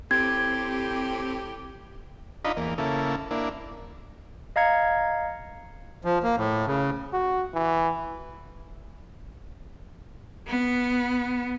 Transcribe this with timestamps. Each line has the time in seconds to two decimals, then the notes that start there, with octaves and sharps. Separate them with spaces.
0.11 A2 C4 G4 G#6
2.45 D4 D#4 F4 D#5 A#5 B5
2.57 E2 A#3
2.78 C#3 A#3 E4 A4
3.31 A#3 D4 E4
4.56 D#5 F5 A#5 G#6 C#7
6.05 F3
6.24 A#3
6.37 A2
6.67 C#3
7.13 F#4
7.54 E3
10.47 B3